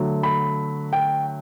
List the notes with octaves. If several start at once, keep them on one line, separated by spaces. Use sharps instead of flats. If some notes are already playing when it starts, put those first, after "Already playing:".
Already playing: D3 F#3 A3
B5
G5